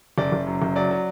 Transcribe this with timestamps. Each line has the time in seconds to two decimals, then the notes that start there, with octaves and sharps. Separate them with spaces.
0.18 F#1 D5
0.32 F#1
0.47 F#2
0.62 F#1
0.76 F#3 D5
0.91 F#3